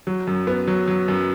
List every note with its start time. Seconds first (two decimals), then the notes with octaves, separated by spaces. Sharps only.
0.07 F#3
0.27 F#2
0.47 B3
0.67 F#3
0.88 F#3
1.08 F#2